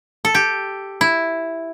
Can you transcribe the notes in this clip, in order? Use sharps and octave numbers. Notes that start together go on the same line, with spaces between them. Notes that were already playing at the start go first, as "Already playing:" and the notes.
A4
G4
E4